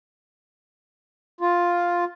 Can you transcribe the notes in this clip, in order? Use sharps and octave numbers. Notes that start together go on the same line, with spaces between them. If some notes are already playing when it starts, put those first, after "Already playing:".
F4